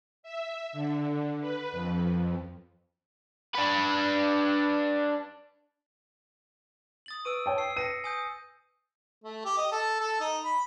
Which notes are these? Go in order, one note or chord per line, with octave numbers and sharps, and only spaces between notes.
E5
D3
B4
F2
D4 B4
D#6 A6 F#7
B4 G#5 C#6 E6 D7 D#7
C#5 G5 A5
E6 C7
B4 D#5 A#6 C#7 D#7
G#5 D#6 G6
A3
G4
D#5
A4
A4
D#4
B5